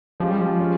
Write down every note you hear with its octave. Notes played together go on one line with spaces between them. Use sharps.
F3 G#3 C#4 G4
G3
F3
G#3 C#4